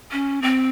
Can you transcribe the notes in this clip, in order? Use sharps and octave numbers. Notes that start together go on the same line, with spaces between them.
C#4
C4